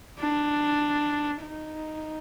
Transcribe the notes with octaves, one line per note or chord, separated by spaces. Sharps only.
D4
D#4